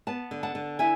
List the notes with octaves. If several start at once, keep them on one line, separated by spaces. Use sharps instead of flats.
B3 F#5 A5
D3
F#5 A5
D3
E4 E5 G#5